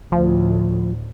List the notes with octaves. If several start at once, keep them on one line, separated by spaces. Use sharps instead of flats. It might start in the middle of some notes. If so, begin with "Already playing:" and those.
D2 A2 F3